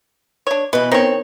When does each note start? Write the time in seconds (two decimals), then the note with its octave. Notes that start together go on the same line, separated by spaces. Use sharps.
0.47 D4 C#5
0.73 B2 E3 B4
0.92 D#3 C4 C#5